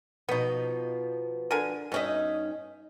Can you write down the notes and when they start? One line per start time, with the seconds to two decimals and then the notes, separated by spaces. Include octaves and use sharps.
0.29 B2 F3 B3 D#4
1.51 D3 A#4 G#5
1.92 G2 B2 C#4 D#4 D#5 E5